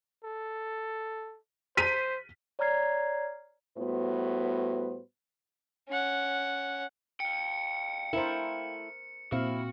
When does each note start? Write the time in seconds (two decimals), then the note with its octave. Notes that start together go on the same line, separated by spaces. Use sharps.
0.24 A4
1.77 C5 B6 D#7
2.59 C#5 D5 A#5 F6 G#6 C7
3.77 A2 G3 B3 F#4 B4 C5
5.88 C#4 F#5
7.20 F5 G5 C#7
8.13 A3 E4 A#4 C5
9.32 A#2 C4 E4 F#4 F5